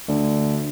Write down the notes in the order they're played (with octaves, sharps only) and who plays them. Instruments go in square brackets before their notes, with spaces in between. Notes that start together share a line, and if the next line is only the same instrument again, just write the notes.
[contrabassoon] D2